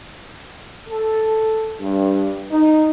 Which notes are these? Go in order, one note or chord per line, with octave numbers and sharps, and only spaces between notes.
A4
G2
D#4